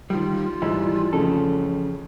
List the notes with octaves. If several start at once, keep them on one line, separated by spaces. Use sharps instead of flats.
D#3 G3 F4
G#2 E3 G3 G#3 E6
A1 F2 C#3 A4